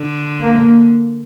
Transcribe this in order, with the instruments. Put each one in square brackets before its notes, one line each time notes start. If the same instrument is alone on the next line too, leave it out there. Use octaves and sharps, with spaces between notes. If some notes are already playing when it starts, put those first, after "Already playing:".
Already playing: [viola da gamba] D3
[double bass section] A#3